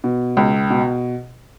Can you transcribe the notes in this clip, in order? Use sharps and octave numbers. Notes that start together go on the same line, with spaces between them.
B2
C#2
B2